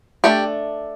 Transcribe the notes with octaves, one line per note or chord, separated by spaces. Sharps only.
A3 D4 G4